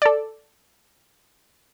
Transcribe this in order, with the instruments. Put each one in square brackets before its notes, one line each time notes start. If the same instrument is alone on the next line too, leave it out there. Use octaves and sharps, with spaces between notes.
[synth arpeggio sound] A4 D5